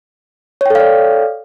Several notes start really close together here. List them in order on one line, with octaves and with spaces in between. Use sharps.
C#5 G5 A4 F5 D5